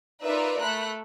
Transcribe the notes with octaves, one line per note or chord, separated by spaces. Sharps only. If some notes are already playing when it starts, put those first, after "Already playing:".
D#4 F4 A#4 B4 D5 E5
A3 B5 F#6 B6